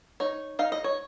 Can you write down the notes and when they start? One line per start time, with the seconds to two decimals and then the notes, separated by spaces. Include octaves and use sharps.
0.20 D#4 C#5
0.59 D#4 F5
0.72 D#5
0.84 C#5